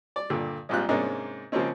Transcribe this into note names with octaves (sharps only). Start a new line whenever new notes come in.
D5
G2 A#2 D3
A#1 G#2 G3 C4 F4 F#6
G#2 C3 G#3 A#3 C#4 D4
C#3 F3 G#3 A#3 C4 C#4